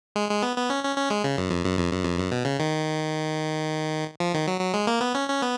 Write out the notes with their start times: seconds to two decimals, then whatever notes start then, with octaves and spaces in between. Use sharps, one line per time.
0.16 G#3
0.30 G#3
0.43 B3
0.56 B3
0.70 C#4
0.84 C#4
0.96 C#4
1.10 G#3
1.24 C#3
1.37 F#2
1.50 F2
1.64 F#2
1.77 F2
1.91 F#2
2.05 F2
2.18 F#2
2.31 B2
2.45 C#3
2.59 D#3
4.20 F3
4.33 D#3
4.47 F#3
4.60 F#3
4.74 G#3
4.87 A#3
5.01 B3
5.15 C#4
5.29 C#4
5.42 B3